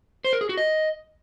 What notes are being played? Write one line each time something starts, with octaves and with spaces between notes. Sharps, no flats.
C5
A#4
G#4
F#4
D#5